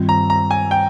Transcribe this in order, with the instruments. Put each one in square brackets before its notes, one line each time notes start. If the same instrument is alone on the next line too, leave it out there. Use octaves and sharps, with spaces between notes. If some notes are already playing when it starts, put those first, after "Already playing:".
Already playing: [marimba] G2 D#3 G3 C4 F4
[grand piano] A#5
A#5
G#5
G5